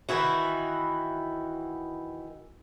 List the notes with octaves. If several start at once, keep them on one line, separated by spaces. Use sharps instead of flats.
D#3 E3 E4 F#4